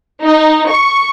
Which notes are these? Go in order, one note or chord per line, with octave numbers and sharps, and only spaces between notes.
D#4
C#6